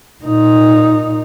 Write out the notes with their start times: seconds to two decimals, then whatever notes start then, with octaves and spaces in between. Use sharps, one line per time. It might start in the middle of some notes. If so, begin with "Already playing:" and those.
0.24 A#2 D#4